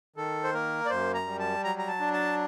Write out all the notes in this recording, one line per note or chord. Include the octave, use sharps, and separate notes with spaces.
D#3 A4
C5
A#3 A#4
D5
F#2 C5
A#5
G3
A5
F#3 A#5
A#5
A5
D4
A5